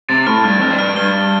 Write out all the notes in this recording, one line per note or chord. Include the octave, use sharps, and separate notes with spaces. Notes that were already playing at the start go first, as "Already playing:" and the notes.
C3 A6
A2 F6
G2 F6
F2 F6
G2
F6
G2 G7
A6